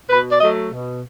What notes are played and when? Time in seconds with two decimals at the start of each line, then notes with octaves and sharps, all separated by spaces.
0.09 B2 B4
0.31 D5
0.40 F#3 A3 D#5
0.71 B2